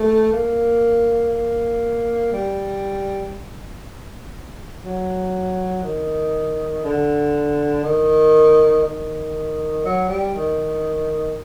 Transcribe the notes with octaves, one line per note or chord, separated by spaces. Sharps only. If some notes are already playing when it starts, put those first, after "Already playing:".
Already playing: A3
A#3
A#3
G3
F#3
D#3
D3
D#3
D#3
F#3
G3
D#3